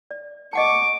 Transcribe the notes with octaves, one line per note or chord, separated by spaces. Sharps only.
D5
D#5 F#5 A5 C#6 D6